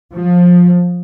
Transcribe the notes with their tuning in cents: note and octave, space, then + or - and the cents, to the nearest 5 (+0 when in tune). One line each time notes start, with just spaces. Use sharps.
F3 +20